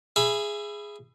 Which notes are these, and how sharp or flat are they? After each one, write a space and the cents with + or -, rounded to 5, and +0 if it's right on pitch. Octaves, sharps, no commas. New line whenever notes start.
G#4 +0 E5 +25 B5 +0